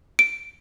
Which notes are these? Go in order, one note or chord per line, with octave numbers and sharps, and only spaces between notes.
D7